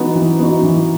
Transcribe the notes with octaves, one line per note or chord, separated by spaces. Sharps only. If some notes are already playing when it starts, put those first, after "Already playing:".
Already playing: E3 B3 D#4 F#4
E3
B3 D#4 F#4
E3